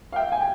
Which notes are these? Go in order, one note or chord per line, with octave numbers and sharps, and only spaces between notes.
F5
E5 G5
F5
G#5
G5